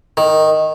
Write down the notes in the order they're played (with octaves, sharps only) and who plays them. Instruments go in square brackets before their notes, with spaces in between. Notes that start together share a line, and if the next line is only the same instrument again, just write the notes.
[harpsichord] D#3